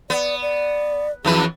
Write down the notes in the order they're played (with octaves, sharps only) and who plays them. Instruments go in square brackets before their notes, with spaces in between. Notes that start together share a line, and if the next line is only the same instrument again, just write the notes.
[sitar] B3 [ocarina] D5
[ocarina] D5
[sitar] F2 E3 B4 [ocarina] G#4